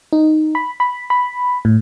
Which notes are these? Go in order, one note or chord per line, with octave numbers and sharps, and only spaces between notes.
D#4
B5
B5
B5
A2